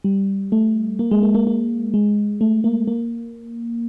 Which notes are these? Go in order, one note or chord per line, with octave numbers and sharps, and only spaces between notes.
G3
A3
A#3
G#3
A#3
A#3
A#3
G#3
A3
A#3
A#3